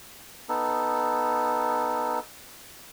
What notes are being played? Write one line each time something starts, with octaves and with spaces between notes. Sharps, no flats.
B3 D#4 A4